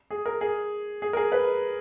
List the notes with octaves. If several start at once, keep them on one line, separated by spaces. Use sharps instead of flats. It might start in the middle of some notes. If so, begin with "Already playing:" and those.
G#4
A#4
G#4
G#4
A#4
G#4
B4